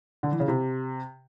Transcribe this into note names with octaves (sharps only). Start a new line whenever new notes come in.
D3
E3
C#3
C3